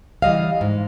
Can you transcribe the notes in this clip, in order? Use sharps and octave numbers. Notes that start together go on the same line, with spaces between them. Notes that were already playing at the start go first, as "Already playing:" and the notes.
E3 G3 D#5 F5
G#2